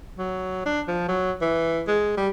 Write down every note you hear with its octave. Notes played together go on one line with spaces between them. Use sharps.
F#3
D4
F3
F#3
E3
G#3
G3